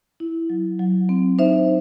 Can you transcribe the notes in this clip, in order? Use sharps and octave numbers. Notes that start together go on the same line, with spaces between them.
E4
F#3
F#3
C4
D#4 C5 E5